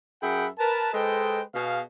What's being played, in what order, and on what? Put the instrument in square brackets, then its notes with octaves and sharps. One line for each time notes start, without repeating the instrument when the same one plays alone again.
[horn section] F#2 G#4 E5 F#5 G5 B5
A#4 B4 A5
G#3 A4 B4 C5 D#5 G5
B2 G#4 F5